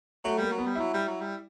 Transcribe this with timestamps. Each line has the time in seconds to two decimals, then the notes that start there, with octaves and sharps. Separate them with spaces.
0.25 F#3 A3
0.38 G3 A#3
0.52 F#3
0.58 B3
0.66 G3
0.75 F#3 E4
0.94 G3
1.08 F#3
1.21 G3